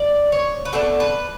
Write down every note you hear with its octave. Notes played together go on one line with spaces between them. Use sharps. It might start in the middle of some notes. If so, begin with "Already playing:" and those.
Already playing: D5
C#5
B4
B2 A3 D4 A4
B4